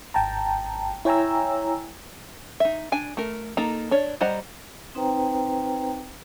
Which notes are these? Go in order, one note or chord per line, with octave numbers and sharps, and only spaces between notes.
G#1 G5 A5 A#5
E4 C#5 G5 G#5 A#5 E6
D#4 E5
D4 G#5
A3 A#4
A#3 D#4 A4 A#5
D4 C#5
G3 C5 D#5 F#5 A#5
C4 D#4 B4 C5 G5 A#5